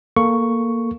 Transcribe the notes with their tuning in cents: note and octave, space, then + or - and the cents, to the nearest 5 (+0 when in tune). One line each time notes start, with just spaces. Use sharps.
A#3 +0 A4 +0 C#6 +5